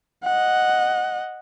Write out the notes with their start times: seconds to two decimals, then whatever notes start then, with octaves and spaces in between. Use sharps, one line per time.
0.24 D#5 F#5